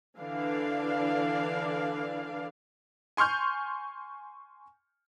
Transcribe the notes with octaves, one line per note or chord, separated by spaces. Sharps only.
D3 E3 D4 D5 F5
G#5 C6 C#6 F6 G6